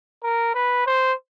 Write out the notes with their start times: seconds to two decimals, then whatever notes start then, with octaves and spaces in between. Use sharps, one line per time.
0.23 A#4
0.55 B4
0.86 C5